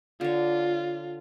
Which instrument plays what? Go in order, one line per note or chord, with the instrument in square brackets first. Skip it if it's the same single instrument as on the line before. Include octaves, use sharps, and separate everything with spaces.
[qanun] D3 C#5 [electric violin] F4